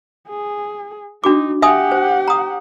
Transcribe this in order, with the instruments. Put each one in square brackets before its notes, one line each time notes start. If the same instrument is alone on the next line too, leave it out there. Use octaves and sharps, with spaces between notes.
[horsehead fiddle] G#4
[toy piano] D4 F#4 D6 [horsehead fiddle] D#4
[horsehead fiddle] G4 F#5 [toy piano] E5 G#5 D#6
[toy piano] C5
A#5 D#6